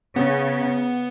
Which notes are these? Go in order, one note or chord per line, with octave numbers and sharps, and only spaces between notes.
C#3 B3